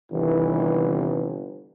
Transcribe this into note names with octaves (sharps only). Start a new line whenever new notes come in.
G1 C2 D#3 E3